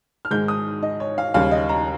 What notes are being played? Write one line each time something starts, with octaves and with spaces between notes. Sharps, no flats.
F6
G#2 D#3 G#3 G6
D#6
D#5
C#5
F5
D#2 C#3 G3 F5
D#5
A#5